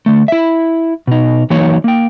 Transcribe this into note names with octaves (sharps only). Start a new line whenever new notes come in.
D3 A3
E4 E5
B2 D#4
E3 F#3 A#3 D#4 C#5
A#3 G5